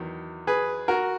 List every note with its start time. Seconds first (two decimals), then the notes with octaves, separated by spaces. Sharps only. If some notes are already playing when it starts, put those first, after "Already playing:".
Already playing: E2 D#3 F#3
0.47 G#4 B4
0.88 F#4 A#4